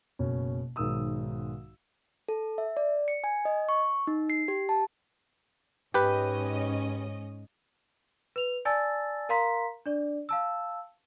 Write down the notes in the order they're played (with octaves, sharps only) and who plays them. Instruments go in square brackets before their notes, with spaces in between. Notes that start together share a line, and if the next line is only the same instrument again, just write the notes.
[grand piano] F#1 B2 C#4
B1 G#2 D#3 A#4 D#6 E6
[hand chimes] A4
E5
D5
C#7
G#5
D#5
C#6
D#4
C7
G4
A5
[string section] G#2 C#4 D#5 [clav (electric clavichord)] G4 B4
[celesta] B4 F7
D5 G#5 A5 E6 A6
A#4 F5 A#5 C6 B6
D4 D5
F5 A5 E6